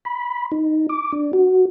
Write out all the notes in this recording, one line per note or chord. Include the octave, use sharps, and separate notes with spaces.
B5
D#4
D6
D4
F#4